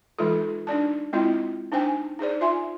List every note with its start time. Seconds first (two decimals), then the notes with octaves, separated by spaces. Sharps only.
0.19 E3 G#3 D#4 F4 A4
0.67 D4 D#4 D5 A5
1.13 G#3 C4 E4 F4 D#5 G5
1.72 D4 D#4 C5 G5 G#5
2.19 D#4 G#4 C5 D5
2.41 F4 E5 G#5 C6